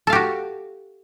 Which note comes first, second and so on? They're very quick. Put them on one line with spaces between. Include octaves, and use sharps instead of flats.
A4 F5 G4 F#4